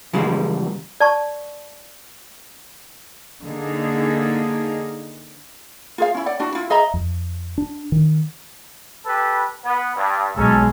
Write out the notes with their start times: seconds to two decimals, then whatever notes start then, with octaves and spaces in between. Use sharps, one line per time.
0.13 C#3 E3 F3 G3 G#3
1.00 D5 A5 C#6
3.43 D3 A#3 D#4 G#4
5.98 F4 G#4 F5
6.14 C#4 E4
6.26 D5 F#5
6.40 D4 E4 F#4
6.55 E4 F4
6.70 G#4 D#5 E5 A#5
6.94 F2
7.58 D4
7.92 D#3
9.06 G4 A4 B4
9.65 B3
9.96 G2
10.36 B1 G#3 C#4 D#4 A4